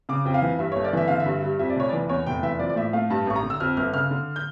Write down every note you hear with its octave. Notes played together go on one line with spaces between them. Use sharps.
C#3 D6
F2 G5
F5
E3
G2 E5
C#5
G1
D5
E3 E5
D3 F5
E5
G2
G3
F2 E5
D5
F1 C#5
E3 D5
E2 C#5
F1 G5
E3 E5
F3 D5
D5
A2 E5
A3 F5
G2 A5
A1 C#6
A#5
D3
E6
F2 F6
G1 F6
C#3 F6
D3
G6